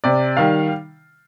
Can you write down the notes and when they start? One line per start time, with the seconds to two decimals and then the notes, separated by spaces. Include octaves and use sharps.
0.04 C3 D5
0.37 D#3 G3 F5